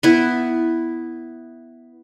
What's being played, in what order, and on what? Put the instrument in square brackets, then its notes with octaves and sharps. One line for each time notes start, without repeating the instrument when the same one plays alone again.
[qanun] B3 E4